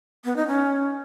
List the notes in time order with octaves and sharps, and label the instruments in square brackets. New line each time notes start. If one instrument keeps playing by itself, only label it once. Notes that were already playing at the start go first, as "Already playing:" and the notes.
[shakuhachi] B3
D#4
C#4